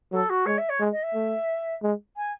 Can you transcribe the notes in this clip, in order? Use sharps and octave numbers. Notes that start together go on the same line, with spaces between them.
F#3 A4
F#4
G#3 C#5
E5
C#5
G#3
D#5
E5
A3
G#3
G#5